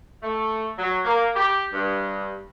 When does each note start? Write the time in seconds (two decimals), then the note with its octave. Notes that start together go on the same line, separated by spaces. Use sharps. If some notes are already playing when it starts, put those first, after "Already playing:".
0.22 A3
0.77 F#3
1.04 A#3
1.35 G4
1.72 G2